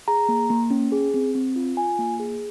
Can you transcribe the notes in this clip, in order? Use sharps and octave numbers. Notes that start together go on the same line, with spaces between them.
G#4 A#5
A#3
A#3
C#4
G#4
C4
C4
F4
F4 G#5
A#3
G#4